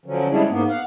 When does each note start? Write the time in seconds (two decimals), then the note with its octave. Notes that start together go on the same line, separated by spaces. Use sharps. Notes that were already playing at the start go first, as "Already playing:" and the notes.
0.06 D3 F3 F#3 C#4
0.30 G3 G#3 C#4 D4 E4 G#4
0.49 G#2 A#3 B3
0.68 F5 F#5